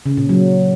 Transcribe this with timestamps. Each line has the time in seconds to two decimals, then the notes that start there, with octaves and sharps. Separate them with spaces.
0.06 C#3
0.17 A#2
0.29 F#3